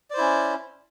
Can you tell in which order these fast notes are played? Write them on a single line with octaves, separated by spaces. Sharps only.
D5 C5 E4 C#4